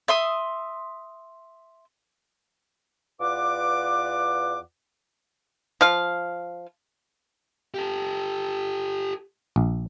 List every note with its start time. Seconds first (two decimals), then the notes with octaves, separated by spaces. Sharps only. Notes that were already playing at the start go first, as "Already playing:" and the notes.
0.08 E5 C6 D#6
3.20 E2 F4 B4 D5 F#5 D6
5.81 F3 F5
7.74 G4 A4
9.56 A#1